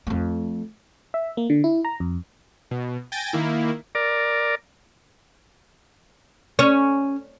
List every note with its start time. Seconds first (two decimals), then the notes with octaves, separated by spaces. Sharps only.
0.07 F2 A3
1.14 E5
1.37 A#3
1.50 D3
1.64 E4
1.85 A#5
2.00 F2
2.71 B2
3.12 G5 G#5 G6 A6 A#6
3.33 D#3 A#3 E4
3.95 A#4 D5
6.59 C#4